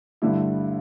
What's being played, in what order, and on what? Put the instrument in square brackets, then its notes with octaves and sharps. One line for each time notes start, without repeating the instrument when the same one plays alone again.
[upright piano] G2 D3 A3 E4